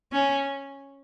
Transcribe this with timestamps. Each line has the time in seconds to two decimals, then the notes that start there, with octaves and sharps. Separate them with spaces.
0.12 C#4